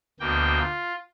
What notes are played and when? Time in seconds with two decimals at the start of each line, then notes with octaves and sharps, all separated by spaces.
0.20 D2 B2 A#3 G5
0.59 F4